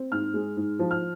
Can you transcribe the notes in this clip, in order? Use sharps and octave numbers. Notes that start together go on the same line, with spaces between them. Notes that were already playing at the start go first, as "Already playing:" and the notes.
Already playing: C4
G#2 F6
G#3
G#2
F3
F6